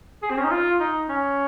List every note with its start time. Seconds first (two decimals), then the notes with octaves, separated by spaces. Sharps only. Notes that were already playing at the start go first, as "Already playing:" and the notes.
0.22 G#4
0.30 C4
0.38 C#4
0.44 D#4
0.51 F4
0.80 D#4
1.09 C#4